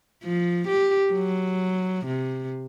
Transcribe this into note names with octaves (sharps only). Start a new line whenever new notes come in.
F3
G4
F#3
C3